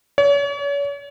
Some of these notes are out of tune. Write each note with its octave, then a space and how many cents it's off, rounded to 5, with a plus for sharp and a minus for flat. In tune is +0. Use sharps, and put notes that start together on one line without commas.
C#5 +40